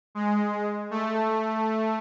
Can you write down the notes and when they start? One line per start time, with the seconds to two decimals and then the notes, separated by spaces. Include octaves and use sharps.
0.15 G#3
0.91 A3